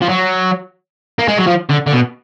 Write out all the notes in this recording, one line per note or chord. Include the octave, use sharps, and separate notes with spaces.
F3
F#3
A#3
G#3
F#3
F3
D3
D3
B2